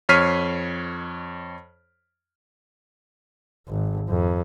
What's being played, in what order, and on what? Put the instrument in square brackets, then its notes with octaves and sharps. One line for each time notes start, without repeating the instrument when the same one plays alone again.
[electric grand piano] F2 C#5 F6 B6 C7 D#7
[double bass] G#1
F2